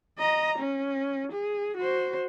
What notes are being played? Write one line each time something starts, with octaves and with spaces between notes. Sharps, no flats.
D#5 A#5
C#4
G#4
F#4 C5